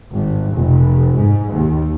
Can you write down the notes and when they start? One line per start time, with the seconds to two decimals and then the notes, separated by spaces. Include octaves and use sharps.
0.14 G#1
0.54 F1
1.16 G#2
1.51 D#2